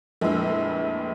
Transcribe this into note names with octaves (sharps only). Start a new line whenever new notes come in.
A#1 F2 A2 G#3 B4 E6